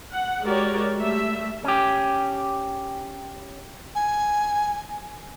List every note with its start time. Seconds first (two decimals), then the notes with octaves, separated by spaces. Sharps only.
0.12 F#5
0.44 G#3 F#4 G4 A#4 C#5 D5
1.01 G3 A3 E5
1.64 C#4 G4
3.95 G#5